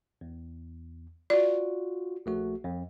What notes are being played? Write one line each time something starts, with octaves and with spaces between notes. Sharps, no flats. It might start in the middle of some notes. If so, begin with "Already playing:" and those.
E2
F4 F#4 D5
A#1 A3 F#4
F2